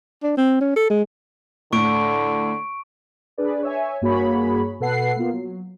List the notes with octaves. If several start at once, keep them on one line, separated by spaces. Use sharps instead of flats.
D4
C4
C#4
A4
G#3
A2 D3 C#6 D7
D4 G#4 B4 D5
C#5 E5 G#5
G2 A#3 F#4 G#4 C#5 B5
B2 A4 B4 F#5 C7
A#3 B3 F4
F#3